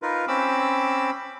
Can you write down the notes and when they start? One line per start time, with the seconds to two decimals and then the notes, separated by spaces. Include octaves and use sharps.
0.02 D#4 F4 A#4 B4
0.28 C4 C#4 B5 D6 E6